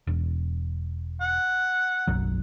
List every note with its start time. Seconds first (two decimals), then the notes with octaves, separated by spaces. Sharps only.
0.07 E1
1.21 F#5
2.07 F#1 B1 F#3